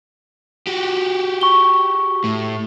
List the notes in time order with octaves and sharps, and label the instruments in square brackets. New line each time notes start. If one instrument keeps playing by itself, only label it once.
[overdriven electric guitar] F#4 G4
[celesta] C#6 G7
[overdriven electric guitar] A2